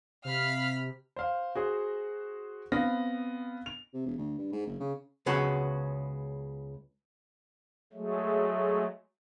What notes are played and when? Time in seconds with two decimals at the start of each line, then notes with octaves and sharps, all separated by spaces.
0.25 C3 F5 B5 F6
1.16 C5 F5
1.55 F#4 G#4 C5
2.72 B3 C4 F5 A#6
3.66 F7
3.94 C3
4.06 E1
4.18 D2
4.38 G2
4.53 G#2
4.67 F#1
4.80 C#3
5.26 C#2 G#3 B3 C#4 F#4 A5
7.93 F#3 G#3 A3